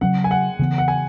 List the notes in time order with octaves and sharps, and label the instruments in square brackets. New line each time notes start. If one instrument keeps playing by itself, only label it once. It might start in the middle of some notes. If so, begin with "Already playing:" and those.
[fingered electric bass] C#3 F#3 C#4 [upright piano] F#5
[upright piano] G#5
F#5
[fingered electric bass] C#3 E3 B3
[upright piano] F#5
G#5